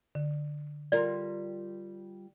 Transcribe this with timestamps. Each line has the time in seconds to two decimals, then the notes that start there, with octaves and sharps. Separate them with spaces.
0.15 D3
0.92 G3 F4 A#4 D5